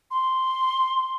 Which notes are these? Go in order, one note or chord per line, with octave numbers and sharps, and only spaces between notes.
C6